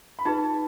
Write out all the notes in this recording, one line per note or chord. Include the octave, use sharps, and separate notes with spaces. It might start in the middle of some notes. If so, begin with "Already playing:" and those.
B5
D#4 G#4 B4 A5